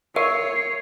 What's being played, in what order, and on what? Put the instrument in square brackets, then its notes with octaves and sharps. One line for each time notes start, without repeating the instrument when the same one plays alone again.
[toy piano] A#4 [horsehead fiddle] C#5 [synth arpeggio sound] E5 C#6 [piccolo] C7